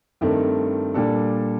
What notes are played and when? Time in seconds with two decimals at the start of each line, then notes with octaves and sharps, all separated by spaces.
0.21 G2 D#3 A3 C4
0.94 A#2 G3 D4 A4